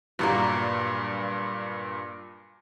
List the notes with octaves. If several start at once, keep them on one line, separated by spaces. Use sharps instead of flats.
G2 A#2 F#3 G3 A#3